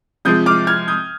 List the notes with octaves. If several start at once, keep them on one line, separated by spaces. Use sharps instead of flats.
C3 F3 G#3 D#6 G6
D6 F6
F6 G#6
D#6 G6